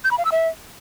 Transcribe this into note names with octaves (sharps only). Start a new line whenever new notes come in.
G6
B5
F5
E6
E5